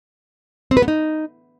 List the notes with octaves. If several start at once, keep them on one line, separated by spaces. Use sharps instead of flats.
C4
B4
B3
D#4